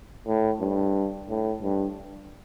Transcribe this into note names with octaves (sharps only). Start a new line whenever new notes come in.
A2
G2
A2
G2